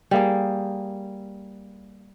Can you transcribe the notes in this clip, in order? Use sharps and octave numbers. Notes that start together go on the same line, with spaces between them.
G3 A#3 G#4